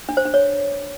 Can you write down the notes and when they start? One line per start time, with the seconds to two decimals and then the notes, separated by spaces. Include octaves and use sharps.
0.09 D4
0.17 C5
0.25 D4
0.34 C#5